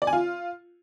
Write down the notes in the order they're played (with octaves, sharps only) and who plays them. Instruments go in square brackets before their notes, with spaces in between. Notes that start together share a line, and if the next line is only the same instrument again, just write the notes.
[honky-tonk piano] D5
G#5
F4